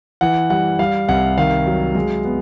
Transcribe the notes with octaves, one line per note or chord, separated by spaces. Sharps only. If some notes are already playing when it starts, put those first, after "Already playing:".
E3 F#5
G3 F#5
G3 F5
C2 F#5
D#3 F5
F#3
G#3
B3